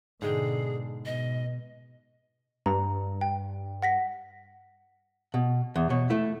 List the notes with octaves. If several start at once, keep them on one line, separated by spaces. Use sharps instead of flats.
G#2 B2 D3 G#3 G#4 G5
B2 D#5
G2 A#5
G5
F#5 A#6 B6
B2
E2
B2 C#5
A3 E4